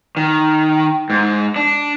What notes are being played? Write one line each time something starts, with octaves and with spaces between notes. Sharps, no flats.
D#3
G#2
D4